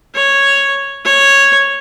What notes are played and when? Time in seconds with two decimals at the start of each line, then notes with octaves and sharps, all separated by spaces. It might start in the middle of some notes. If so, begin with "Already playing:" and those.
0.15 C#5
1.05 C#5